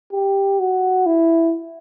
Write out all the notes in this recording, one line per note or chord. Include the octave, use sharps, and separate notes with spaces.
G4
F#4
E4